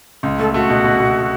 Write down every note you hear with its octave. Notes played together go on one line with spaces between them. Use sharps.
C#2
A3 A4
A3 F#4
B2
B2
B2